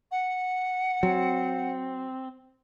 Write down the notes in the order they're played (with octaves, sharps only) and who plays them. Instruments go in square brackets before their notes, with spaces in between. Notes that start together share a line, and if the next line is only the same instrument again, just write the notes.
[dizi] F#5
[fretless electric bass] F#3 [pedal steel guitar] C4